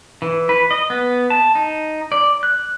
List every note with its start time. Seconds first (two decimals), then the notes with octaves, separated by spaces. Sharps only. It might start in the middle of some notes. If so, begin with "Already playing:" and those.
0.22 E3
0.49 B4
0.71 D#5
0.90 B3
1.30 A5
1.55 D#4
2.12 D5
2.43 F#6